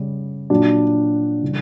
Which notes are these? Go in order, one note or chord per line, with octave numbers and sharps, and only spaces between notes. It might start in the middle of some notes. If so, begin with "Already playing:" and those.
Already playing: C#3 G3
A#2 F#3 D4 F#4
C#3 E3 G3